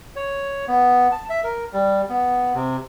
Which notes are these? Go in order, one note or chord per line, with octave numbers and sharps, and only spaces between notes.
C#5
B3
A5
E5
A#4
G3
B3
C3